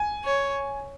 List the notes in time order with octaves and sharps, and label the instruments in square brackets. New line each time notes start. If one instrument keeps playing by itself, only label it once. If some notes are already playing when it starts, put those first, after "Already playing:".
Already playing: [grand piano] G#5
[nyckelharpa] C#5